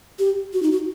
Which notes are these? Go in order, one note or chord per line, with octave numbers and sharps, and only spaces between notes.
G4
F#4
D#4
F#4